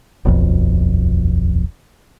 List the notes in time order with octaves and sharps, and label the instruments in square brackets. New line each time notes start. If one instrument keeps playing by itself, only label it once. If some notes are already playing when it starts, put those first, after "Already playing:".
[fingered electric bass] D#1 B1 F2